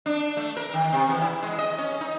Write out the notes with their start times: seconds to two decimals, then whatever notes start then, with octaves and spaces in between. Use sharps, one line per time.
0.06 D4
0.37 A3
0.57 A#4
0.73 D#3
0.92 C3
1.07 E2
1.21 E4
1.43 G#3
1.59 D#5
1.78 C#4
2.01 D#4